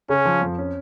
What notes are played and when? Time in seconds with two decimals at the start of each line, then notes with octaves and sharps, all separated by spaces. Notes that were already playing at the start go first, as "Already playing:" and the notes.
0.09 C#3 C#4
0.25 F3
0.41 F2
0.58 C#4